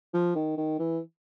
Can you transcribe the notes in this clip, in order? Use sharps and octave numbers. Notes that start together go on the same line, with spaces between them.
F3
D#3
D#3
E3